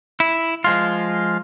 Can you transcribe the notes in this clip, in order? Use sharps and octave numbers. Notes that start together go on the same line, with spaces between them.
E4
F3 G#3 F4